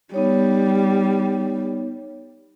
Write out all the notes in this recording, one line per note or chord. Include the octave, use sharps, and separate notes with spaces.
G3 B3 D#4 C#5